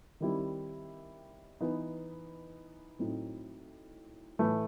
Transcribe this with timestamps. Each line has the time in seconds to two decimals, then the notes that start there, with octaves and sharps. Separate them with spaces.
0.20 D#3 G3 C4 E4
1.61 E3 B3 D#4
2.99 A2 F#3 C4 D#4
4.39 A2 E3 A3